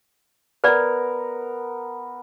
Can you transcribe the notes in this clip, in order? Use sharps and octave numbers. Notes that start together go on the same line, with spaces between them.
B3 A#4 B4 D5